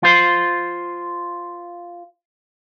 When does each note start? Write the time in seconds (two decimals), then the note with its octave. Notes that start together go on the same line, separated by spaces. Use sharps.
0.03 F4 C5